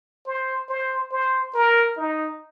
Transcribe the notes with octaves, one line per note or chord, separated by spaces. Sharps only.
C5
C5
C5
A#4
D#4